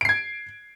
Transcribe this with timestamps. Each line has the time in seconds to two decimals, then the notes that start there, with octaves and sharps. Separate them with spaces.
0.01 D7
0.05 C7
0.09 G#6